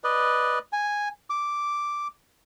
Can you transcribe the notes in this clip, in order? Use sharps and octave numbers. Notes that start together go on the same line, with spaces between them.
B4 D5 D#5
G#5
D6